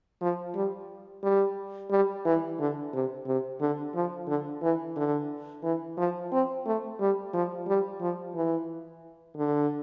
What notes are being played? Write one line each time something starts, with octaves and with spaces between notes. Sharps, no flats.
F3
G3
G3
G3
E3
D3
C3
C3
D3
F3
D3
E3
D3
E3
F3
C4
A3
G3
F3
G3
F3
E3
D3